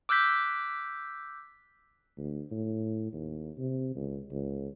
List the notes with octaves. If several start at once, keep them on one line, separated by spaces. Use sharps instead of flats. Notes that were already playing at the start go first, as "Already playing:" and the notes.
D6 E6 F#6 G6 B6
D2
A2
D#2
C3
C#2
C#2